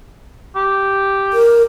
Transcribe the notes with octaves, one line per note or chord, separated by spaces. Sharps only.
G4
A#4